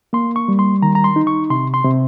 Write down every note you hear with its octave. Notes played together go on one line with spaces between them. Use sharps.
A#3 C6
C#6
G3
C6
D#3 A#5
A#5
C6
D#4
C#6
C3 C6
C6
C3